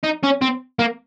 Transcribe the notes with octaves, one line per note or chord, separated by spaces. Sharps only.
D#4
C#4
C4
A#3